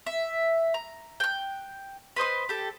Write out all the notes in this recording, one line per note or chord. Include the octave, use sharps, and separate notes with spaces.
E5
A#5
G5 F#6
B4 C5 D#5 C6
G4 A4